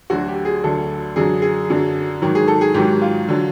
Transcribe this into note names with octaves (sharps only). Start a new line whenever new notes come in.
D2 D3 F#3 F#4
G4
G#4
D2 D3 F#3 A4
F#2 D3 F#3 G#4
G#4
F#2 D3 F#3
G#2 D#3 F#3
G#4
A4
G#4
G#2 D#3 F#3 G4
F4
D3 F#3